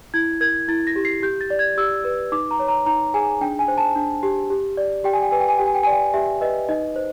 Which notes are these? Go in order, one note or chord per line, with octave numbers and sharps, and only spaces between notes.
E4 G#6
A#4 G#6
E4 A6
A#6
G4
C7
G4 G6
A6
D5
G#6
G4 E6
B4
D#4 D6
A#5
C#5
A#5
D#4 A#5
G#4 G#5
D4 G5
G#5
C5
A5
D4
G4
G4
D5
G4 G5
G#5
G5
B4 G#5
G5
G#5
G4 G5
G#5
G5
D5 G#5
G5
G4 E5
B4 D#5
D#4 D#5
C5